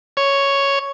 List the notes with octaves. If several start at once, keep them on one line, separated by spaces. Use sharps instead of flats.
C#5